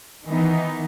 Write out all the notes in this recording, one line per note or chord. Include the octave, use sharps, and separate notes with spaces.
D#3 E3 B3 D#4